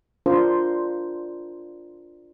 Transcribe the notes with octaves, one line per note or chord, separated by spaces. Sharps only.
D4 F4 A#4 C5